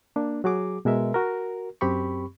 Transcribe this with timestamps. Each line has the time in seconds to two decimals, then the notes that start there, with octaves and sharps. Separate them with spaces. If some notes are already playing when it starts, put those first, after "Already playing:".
0.16 A#3 D4
0.44 F#3 F#4 G#4 D6
0.85 B2 G#3 A#4 E5
1.14 F#4 A#4
1.81 F#2 C4 G4 B5 C#6